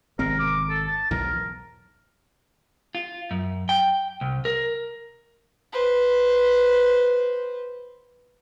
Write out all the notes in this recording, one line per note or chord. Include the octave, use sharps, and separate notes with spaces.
G#1 C3 C4 A#4
D6
A4
A5
B1 E2 G#2 A#4
F4
F#2
G5
C2
A#4
B4 C5